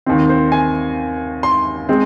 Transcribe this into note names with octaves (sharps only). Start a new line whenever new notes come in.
D#2 D#3 C4
C5
G#5
C6
G#3 C4